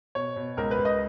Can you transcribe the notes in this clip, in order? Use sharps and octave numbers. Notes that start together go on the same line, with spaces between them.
B2 C#5
B2
C#2 A#4
B4
C#2
D#5